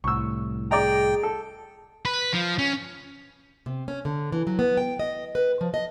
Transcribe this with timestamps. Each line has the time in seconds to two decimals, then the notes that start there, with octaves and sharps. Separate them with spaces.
0.04 C2 A2 C#6 E6
0.71 G#4 D5 D#5 G5 A#5
1.23 A4
2.05 B4
2.33 F3
2.59 C#4
3.66 C3
3.88 C#4
4.05 D3
4.32 E3
4.47 F#3
4.59 B3
4.77 G5
4.99 D#5
5.35 B4
5.61 F3
5.74 D#5